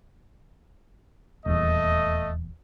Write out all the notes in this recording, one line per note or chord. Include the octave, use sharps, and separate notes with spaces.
D#1 E2 A3 D#5